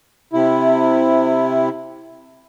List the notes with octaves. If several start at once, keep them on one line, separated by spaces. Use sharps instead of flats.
C3 E4